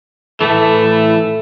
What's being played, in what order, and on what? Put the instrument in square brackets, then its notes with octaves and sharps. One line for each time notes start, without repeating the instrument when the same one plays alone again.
[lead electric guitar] A2 E3 [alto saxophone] A3